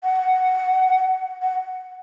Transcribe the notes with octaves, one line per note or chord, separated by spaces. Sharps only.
F#5
F#5